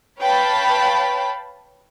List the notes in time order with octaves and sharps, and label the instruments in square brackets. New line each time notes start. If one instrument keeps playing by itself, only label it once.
[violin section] B4 C#5 F5 G5 A5 B5